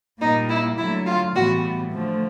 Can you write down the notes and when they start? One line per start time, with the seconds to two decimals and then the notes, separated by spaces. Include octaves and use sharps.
0.20 A#2 G3 A#3 D#4
0.49 E4
0.78 D3 F#3 A3 E4
1.06 F4
1.35 A2 E3 G3 B3 F#4
1.92 D3 F3 A3